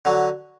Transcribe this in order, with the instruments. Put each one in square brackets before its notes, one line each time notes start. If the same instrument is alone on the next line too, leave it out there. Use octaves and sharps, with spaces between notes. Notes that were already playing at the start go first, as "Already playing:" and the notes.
[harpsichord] D3 F#3